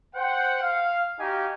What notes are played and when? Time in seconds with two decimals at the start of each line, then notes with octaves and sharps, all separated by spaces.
0.15 C5 F#5 G5
0.61 F5
1.19 D#4 F#4 G4 F5 G#5 A#5